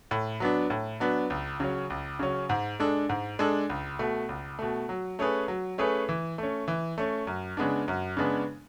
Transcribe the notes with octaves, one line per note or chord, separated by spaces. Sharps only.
A2
F#3 B3 D4
A2
F#3 B3 D4
C#2
C#3 F#3 C#4
C#2
C#3 F#3 C#4
G#2
G#3 D4 A4
G#2
G#3 D4 A4
C#2
B2 A3
C#2
B2 A3
F#3
A3 C#4 G#4 B4
F#3
A3 C#4 G#4 B4
E3
A3 C#4
E3
A3 C#4
F#2
C#3 G#3 B3 D4
F#2
C#3 G#3 B3 D4